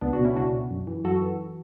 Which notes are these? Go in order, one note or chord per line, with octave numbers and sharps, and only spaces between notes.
C#2 B3 D4
D4 F#4
B2
C#4 E4
C#2 D4 F#4
B2
F#2
E3
F#2 F#4 A4
E3